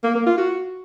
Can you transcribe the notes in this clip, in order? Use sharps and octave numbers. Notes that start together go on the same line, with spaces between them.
A#3
A#3
F4
F#4